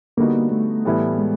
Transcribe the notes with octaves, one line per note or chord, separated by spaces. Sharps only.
D3 G3 A#3 B3 D#4 F#4
A3
A2 E3 G3 B3 E4
G#3